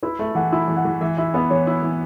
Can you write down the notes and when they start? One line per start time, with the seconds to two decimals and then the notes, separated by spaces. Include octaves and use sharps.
0.03 E4 B4
0.19 A3 E5
0.35 E3 F#5
0.52 E4 E5
0.68 E3
0.77 F#5
0.85 E3
1.01 E3 E5
1.17 E4 E5
1.34 B3 B4
1.50 E3 C#5
1.67 E4
1.83 E3